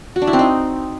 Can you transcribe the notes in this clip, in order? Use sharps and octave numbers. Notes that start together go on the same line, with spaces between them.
F#4
D4
E4
C4
D#4